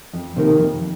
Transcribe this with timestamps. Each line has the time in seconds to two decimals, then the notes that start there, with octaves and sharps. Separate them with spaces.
0.13 F2
0.36 C3 D#3 A#3
0.59 F2